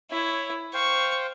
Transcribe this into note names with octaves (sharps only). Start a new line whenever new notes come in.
E4 C#5
C5 F5 G5 C#6